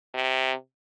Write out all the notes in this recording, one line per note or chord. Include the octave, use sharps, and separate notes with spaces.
C3